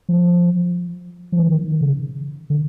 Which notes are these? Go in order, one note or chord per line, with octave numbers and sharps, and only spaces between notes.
F3
F3
E3
D#3
C#3
D3